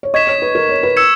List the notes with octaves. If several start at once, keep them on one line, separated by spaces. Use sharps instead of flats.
C#5
D#5 C#6 G#6 B6 E7
C#5
B4
A#4
C#5
B4
E6 G#6 C#7 E7